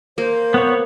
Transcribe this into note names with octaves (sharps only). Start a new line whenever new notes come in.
A#3 C5
B3 C#5